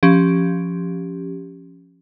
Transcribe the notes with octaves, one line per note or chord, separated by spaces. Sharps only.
F3 C#4 G4